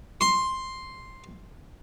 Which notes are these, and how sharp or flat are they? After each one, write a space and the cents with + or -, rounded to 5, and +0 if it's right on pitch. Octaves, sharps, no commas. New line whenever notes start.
C6 +5